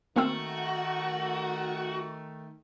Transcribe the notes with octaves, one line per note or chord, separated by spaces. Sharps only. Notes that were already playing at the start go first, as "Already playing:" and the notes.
D#3 A3 A#3 C4 F#4 E6